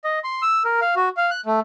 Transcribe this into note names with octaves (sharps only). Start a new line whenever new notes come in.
D#5
C6
E6
A#4
F5
F#4
F5
F#6
A3